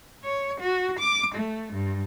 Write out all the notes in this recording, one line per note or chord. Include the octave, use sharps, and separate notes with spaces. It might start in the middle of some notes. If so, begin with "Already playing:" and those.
C#5
F#4
D6
A3
G2